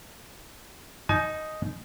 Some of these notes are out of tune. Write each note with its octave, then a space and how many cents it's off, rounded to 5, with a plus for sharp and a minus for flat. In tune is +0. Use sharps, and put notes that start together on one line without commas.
D#4 +0 G#5 +35